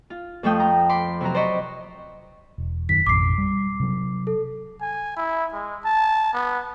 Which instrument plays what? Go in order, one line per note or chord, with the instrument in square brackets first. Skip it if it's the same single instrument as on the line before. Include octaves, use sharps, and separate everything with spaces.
[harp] F4
F2 F3 A3 G5 D#6
A#5
B5 C6 D6
C3 F#3 F#4 A#5
C5 D5 D#5 B5 C#6
[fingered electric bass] E1
[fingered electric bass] F#2 D#3 [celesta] B6
[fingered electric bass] A1 F2 B2 [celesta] D6 C7
[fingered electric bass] G3
C3 F#3
[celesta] A4
[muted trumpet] G#5
E4
G#3
A5
B3